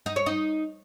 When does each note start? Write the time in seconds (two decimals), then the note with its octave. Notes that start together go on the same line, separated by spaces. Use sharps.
0.06 D#4
0.16 C#5
0.26 D#4